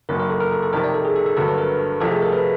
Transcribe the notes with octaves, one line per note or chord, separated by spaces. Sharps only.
F#1 F#2 D#3 F#3 A#4
A#4
A4
A#4
A4
A4
F2 C3 D#3 A#4
D5
A4
G#4
A4
A4
G1 G2 D3 F#3 A4
B4
A#4
F2 C3 F3 A3 A4
G#4
A#4
B4